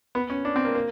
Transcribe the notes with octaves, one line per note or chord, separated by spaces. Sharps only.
B3
C#4
D4
C4
A#3
A#3